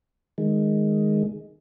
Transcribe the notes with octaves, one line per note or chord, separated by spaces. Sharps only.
D#3 G#3